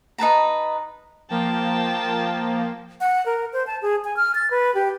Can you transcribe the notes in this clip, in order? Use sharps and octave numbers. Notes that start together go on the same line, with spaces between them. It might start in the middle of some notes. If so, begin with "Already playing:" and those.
D#4 B4 A5 A#5
F3 A#3 G5 A5
F#5
A#4
C5
A5
G#4
G#5
F6
A6
B4
G4